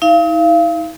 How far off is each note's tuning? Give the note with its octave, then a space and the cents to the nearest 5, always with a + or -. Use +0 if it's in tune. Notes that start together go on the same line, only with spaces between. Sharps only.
D#4 +45 F5 -30